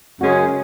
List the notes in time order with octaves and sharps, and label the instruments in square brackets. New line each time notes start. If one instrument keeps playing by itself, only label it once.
[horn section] F#2 C#3 G#3 C#4 G#4 [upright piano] F#4